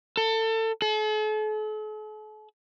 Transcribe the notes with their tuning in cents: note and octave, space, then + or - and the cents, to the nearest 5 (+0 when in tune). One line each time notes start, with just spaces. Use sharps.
A4 +25
A4 -45